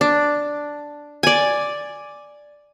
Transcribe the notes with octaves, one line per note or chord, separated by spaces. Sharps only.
D4
D5 G#5